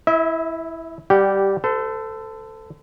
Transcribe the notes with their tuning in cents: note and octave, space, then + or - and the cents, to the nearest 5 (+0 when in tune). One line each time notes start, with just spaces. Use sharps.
E4 +0 E5 -40
G3 +0 G4 -10 F#5 +5
A4 +10 C5 -40